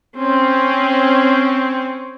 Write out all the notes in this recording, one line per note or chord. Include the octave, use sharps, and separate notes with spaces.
C4 C#4